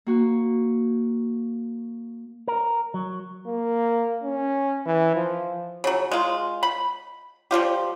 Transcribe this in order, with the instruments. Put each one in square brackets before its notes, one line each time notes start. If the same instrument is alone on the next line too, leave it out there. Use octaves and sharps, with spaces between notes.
[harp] A#3 F#4
[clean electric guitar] A#4
F#3
[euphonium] A#3
C#4
E3
F3
[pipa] C#3 F#3
G#3 F4
B5
F3 G3 F4 G4